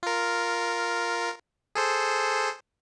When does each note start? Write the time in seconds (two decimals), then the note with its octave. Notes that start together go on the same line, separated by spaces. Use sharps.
0.03 F4 A#4
1.75 G#4 A4 C5